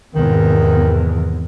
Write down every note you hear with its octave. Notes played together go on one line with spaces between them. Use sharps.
E2 G#2 C3 D#3